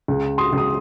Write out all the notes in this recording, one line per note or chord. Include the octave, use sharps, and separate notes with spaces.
C#2
C6 D#6
C#2
D#6